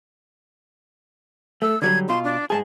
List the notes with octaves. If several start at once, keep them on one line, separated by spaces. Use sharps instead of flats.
A3 E6
D3 F#3 G3 G#6
B2 F4 C6
D4
G#2 G#3 G#4 A5